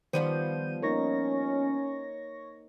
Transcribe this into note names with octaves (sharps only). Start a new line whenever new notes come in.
D#3 F3 G3 B3 C5 G6 D#7
A#3 C#4 D#4 A#4 C#5 C#6 A#6